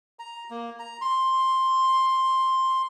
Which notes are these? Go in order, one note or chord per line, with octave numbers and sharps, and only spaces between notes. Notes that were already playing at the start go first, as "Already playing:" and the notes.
A#5
A#3
A#5
C6